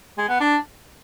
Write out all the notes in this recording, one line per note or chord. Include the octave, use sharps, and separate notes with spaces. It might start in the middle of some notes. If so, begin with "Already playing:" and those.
G#3
B3
D4